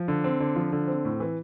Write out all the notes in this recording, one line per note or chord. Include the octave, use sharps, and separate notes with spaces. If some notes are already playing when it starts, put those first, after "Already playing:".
Already playing: F3
D3
C4
D3
F3
D3
C4
A2
E3